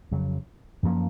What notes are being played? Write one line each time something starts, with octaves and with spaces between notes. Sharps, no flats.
F2 C#3 F#3
F#2 F3 A#3 C#4